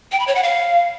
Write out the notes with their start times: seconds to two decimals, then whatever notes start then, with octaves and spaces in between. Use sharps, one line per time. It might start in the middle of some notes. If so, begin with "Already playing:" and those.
0.12 G5
0.20 B5
0.28 C#5
0.35 F#5
0.43 F5